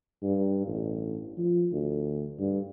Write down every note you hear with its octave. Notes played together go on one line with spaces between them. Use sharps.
G2
A1
F3
D2
G2